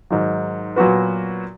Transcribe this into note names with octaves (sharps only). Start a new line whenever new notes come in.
G#2 D#3 F#3
A#2 F#3 B3 F#4 B4